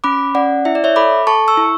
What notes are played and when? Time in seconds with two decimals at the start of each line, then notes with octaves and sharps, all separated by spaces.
0.04 C#4 B5 D6
0.35 C#4 D5 F#5
0.65 E4 E5
0.75 D5
0.84 C#5 E5
0.96 A4 B5 D6
1.27 A4 A5 C#6
1.48 C#6 E6
1.57 E4